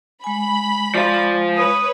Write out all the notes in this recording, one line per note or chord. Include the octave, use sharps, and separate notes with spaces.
G#3 G#5 B5
F3 F4 D5
B4 C#5 D#6